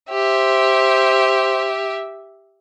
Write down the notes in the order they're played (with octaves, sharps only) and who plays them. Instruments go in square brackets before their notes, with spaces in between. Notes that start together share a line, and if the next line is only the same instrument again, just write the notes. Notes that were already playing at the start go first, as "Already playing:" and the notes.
[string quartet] G4 E5 [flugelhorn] C5